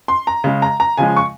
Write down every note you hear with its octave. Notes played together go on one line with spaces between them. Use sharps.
C6
A#5
C#3 G#3
A#5
A#5
C#3 F3 G#3 G#5
C#6